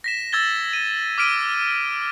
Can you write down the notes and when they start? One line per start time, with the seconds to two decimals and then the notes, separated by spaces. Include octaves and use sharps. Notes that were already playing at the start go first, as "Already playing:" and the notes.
0.04 A#6 B6 E7
0.32 E6 G#6 A6 G7
0.73 D#7
1.18 D6 F6 B6 D7 D#7